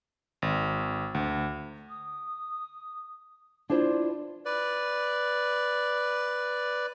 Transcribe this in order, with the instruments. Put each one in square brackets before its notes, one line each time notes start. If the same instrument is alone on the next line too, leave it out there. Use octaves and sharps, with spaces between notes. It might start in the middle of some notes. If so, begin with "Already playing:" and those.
[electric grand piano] G#1
D2
[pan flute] D#6
[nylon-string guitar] D4 E4 C5 [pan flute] F4
[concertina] B4 D5